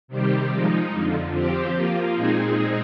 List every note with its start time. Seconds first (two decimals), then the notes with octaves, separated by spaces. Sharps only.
0.08 C3 D#3 G3 C4 G4
0.50 F3 G#3 D#4
0.91 F2 D3 F3
1.33 F3 C4 G4
1.74 F3 A#3 F4
2.15 A#2 G#3 C4 D#4 G#4